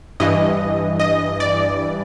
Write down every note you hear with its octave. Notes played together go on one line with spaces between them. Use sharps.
G2 E3 D#5
D#5
D5